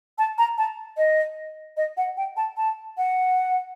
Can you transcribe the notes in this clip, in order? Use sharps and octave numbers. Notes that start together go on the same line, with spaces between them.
A5
A#5
A5
D#5
D#5
F#5
G5
A5
A5
F#5